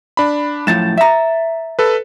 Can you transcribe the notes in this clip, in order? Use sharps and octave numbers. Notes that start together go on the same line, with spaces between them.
D4 B5
F#2 A2 F3 A6 E7
E5 A#5
A4 B4